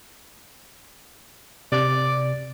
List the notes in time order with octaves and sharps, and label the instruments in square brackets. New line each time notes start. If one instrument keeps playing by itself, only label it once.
[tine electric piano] C3 [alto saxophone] D5